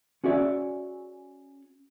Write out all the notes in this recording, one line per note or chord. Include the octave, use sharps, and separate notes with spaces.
C#4 F#4 G#4 D5 E5